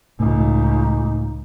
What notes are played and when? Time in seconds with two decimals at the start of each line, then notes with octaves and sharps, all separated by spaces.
0.20 C#2 A2 D#4